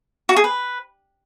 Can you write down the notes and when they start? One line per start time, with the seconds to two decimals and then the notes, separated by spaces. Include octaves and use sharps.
0.29 F#4
0.36 G#4
0.44 B4